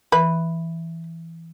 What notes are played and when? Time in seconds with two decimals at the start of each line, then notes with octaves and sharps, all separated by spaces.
0.12 E3 B4